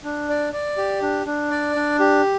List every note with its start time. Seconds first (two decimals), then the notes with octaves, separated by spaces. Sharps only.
0.04 D4
0.29 D5
0.53 D5
0.77 G4
1.02 D4
1.26 D4
1.51 D5
1.76 D4
2.00 G4